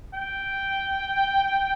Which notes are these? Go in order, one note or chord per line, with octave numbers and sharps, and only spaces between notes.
G5